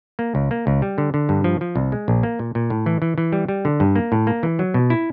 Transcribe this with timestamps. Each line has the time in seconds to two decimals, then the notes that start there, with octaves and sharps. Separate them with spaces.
0.19 A#3
0.35 C#2
0.51 A#3
0.67 C#2
0.82 G3
0.98 D3
1.14 D3
1.29 G2
1.44 F3
1.61 F3
1.76 C2
1.92 G#3
2.08 A#1
2.23 A#3
2.39 A#2
2.55 A#2
2.70 A2
2.86 E3
3.02 E3
3.18 E3
3.32 G3
3.48 G3
3.65 D3
3.80 G2
3.96 A#3
4.12 A2
4.27 A#3
4.43 E3
4.59 F#3
4.74 B2
4.90 E4